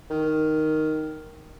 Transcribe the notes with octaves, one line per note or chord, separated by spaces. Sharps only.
D#3